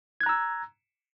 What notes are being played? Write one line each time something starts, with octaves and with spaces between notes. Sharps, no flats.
A#5 E6 F#6 G#6